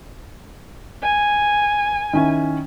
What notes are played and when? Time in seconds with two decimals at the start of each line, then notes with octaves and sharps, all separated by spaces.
1.02 G#5
2.13 D#3 C#4 E4